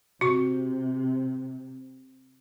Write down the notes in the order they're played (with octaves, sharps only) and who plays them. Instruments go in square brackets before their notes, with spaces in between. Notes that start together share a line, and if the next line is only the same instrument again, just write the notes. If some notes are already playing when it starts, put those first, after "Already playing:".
[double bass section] C3 [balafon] F#4 C#6